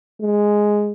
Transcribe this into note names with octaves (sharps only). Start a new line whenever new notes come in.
G#3